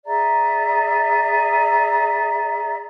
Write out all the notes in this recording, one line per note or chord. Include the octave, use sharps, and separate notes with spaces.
G#4 D5 E5 A#5